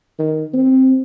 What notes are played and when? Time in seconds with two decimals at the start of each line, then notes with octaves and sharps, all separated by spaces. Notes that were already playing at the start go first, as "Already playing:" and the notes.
0.19 D#3
0.54 C4